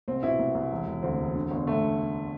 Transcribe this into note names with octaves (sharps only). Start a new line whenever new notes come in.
C2 C4
B2 E4
C2
C2
E1
E1
D2 C4
E1
D3
G1
D3 A3